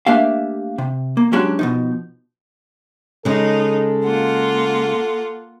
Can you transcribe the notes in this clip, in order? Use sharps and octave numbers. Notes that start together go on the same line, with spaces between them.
A3 A#3 D4 G4 E5 F5
C3
A#3
F#3 G#3 C#4 D4 F#4 G4
B2 F3 D#4
C#3 G#3 D#4 A4
A#3 F4 F#5